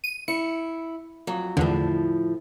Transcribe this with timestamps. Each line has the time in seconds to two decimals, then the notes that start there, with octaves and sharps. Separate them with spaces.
0.04 D#7
0.28 E4 C#7
1.27 F2 F#3
1.57 E2 A2 D3 F3